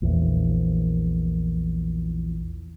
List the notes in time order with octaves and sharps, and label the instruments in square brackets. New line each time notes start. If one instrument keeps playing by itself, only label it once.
[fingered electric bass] A#1 E2